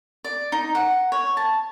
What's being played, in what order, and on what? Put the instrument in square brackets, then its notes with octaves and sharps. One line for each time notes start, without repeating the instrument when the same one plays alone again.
[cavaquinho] D5
D#4
F#5
C#5
A5